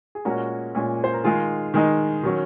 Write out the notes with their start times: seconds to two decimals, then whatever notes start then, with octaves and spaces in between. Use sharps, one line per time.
0.15 G#4
0.25 A#2 G#3 C#4 F#4 A#4
0.75 A#2 G#3 C#4
1.04 C5
1.14 A#4
1.24 D#3 G#3 D#4 F4 G#4
1.74 D#3 G#3 D#4
2.23 D#3 F#3 C#4